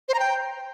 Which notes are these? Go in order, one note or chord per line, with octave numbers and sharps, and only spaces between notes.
C5
A#5
G5